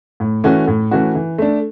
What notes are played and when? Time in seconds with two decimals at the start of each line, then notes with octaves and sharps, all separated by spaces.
0.20 A2
0.44 E3 A3 C#4 F#4
0.68 A2
0.91 E3 A3 C#4 F#4
1.15 E3
1.38 A3 D4